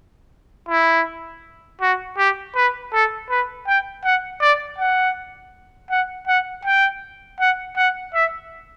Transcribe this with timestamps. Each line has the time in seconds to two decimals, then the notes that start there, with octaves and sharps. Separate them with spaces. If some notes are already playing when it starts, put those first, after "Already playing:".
0.69 E4
1.81 F#4
2.18 G4
2.55 B4
2.93 A4
3.30 B4
3.67 G5
4.04 F#5
4.41 D5
4.78 F#5
5.90 F#5
6.27 F#5
6.65 G5
7.40 F#5
7.77 F#5
8.14 E5